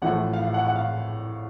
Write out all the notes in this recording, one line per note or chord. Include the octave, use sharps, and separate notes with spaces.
A1 A2 F3 A3 F#5
F5
F5
F#5
F#5
F5